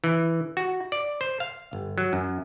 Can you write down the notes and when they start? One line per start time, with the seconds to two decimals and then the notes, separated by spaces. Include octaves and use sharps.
0.04 E3
0.57 F#4
0.92 D5
1.21 C5
1.40 F5
1.73 G1
1.98 F#3
2.13 F#2